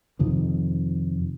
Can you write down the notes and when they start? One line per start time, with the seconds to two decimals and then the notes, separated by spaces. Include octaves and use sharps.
0.19 F2 C3 D#3